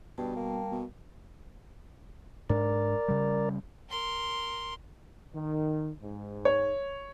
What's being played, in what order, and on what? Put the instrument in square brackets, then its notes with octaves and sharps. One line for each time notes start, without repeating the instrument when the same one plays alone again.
[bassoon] G2 [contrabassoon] B2 [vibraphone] G3 G5 A5
[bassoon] A#3
[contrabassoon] B2
[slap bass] G#2 D4 [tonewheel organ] A#4 D5
[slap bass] C#3 G3
[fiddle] A#4 C6
[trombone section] D#3
G#2
[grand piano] C#5